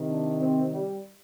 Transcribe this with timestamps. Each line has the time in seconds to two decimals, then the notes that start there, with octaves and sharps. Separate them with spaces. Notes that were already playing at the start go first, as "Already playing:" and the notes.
Already playing: C3 D#3
0.09 D4
0.41 C4
0.72 G3